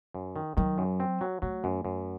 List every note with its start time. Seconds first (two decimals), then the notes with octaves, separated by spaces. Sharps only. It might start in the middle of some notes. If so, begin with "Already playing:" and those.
0.14 F#2
0.36 D#3
0.57 D#3 F#3
0.78 F#2
1.00 C4
1.21 F#3
1.42 F#3 A3
1.64 F#2
1.85 F#2